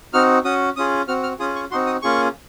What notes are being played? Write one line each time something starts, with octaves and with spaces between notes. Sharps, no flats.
C4 D#4 F#4 F6
C#4 F#4 D#6
C#4 F4 G#4 D#6
C4 F#4 F6
F6
C#4 F4 G#4 D#6
C#6
C4 D#4 F#4 C6
D#6
A#3 C#4 F4 G#4 C#6